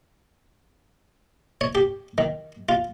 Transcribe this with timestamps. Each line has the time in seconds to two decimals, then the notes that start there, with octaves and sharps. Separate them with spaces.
1.61 C#5
1.75 G4
2.18 D#3
2.69 F4